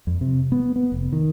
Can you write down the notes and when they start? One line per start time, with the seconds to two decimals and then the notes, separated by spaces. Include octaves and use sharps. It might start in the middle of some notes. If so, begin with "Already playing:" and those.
0.07 F2
0.21 C3
0.52 B3
0.76 B3
0.92 F1
1.12 D#3